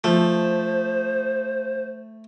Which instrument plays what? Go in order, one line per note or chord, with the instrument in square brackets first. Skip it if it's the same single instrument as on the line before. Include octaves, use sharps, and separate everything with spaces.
[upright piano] F3 [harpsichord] A3 [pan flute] C5